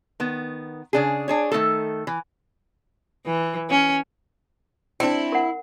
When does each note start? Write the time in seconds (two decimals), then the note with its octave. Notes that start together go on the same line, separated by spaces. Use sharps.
0.20 D#3 B3
0.93 C#3 D4 G#4
1.28 D4 G#4 C#5
1.52 D#3 A3 D#4 A4
2.07 E3
3.26 E3
3.70 C#4
5.00 C4 D4 E4 G5
5.32 A#4 F#5